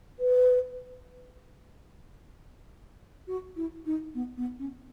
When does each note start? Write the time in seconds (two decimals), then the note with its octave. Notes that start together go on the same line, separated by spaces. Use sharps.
0.19 B4
3.28 F#4
3.56 E4
3.86 D#4
4.15 B3
4.37 B3
4.59 C#4